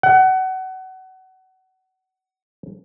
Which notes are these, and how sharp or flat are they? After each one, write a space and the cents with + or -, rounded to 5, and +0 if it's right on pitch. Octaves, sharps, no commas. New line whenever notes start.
F#5 +25